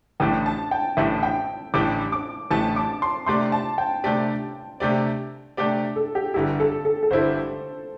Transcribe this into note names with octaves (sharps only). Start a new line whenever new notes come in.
A1 A2 A3 D4 G4 G5
A5
G5
A1 A2 A3 D4 G4 E5
G5
A1 A2 A3 D4 G4 D6
D6
A1 A2 A3 D4 G4 A5
D6
C6
C3 A3 D4 G4 D5 C6
A5
G5
C3 A3 D4 G4 D5
C3 A3 D4 G4 D5
C3 A3 D4 G4 D5
A4
G4
G1 G2 G3 E4 G4
A4
A4
A4
G1 G2 G3 E4 C5